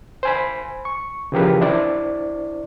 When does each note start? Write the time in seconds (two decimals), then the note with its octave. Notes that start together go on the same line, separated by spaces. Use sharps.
0.23 C5 G#5 B5
0.85 C#6
1.32 C#3 E3 F3 G4 A#4 B4
1.61 D4 E4 C5 D5